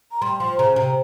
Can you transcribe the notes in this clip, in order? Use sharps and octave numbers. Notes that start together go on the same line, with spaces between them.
A#5
G3 C6
F3 C6
C#3 A#5
C3 A#5